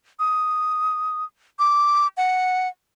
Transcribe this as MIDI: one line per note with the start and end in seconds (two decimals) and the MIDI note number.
0.19 1.25 87
1.59 2.08 86
2.17 2.68 78